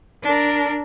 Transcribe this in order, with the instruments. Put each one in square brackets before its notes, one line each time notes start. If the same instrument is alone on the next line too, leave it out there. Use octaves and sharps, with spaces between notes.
[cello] D4 A#4